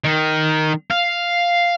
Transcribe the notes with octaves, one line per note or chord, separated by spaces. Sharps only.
D#3
F5